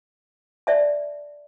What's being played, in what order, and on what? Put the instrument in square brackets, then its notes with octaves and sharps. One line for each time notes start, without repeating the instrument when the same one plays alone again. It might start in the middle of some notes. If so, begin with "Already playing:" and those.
[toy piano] D5 E5 A5